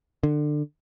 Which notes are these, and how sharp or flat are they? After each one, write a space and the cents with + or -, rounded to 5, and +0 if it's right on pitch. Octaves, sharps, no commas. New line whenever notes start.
D3 +25